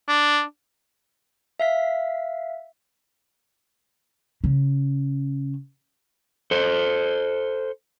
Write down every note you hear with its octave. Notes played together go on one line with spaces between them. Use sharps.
D4
E5 F5 B6
C#3
A4 C5